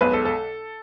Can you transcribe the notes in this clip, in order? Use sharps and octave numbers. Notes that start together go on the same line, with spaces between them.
B1 B2 G#3 B4
A4
A4